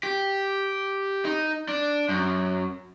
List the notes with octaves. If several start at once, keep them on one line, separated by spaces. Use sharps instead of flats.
G4
D#4
D4
F#2